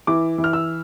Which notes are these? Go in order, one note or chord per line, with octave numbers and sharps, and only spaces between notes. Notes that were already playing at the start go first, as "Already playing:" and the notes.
E3 D6
E3
F6
E6